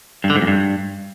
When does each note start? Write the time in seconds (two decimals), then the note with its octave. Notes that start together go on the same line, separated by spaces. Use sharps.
0.24 G2
0.30 D3
0.36 G#2
0.41 F2
0.47 G2